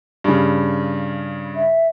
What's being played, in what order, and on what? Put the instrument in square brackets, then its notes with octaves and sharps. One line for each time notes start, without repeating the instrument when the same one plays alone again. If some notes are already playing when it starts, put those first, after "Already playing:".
[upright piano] G2 C#3
[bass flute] E5